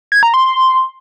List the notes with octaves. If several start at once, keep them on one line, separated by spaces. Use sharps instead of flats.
G#6
A#5
C6